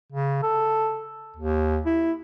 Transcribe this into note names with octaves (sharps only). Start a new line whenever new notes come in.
C#3
A4
D#2
E4